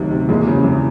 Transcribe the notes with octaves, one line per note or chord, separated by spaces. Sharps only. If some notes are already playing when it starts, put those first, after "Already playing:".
Already playing: D2 C3 D#3 F#3
C3
E2 G#3 A#3
C#3
E2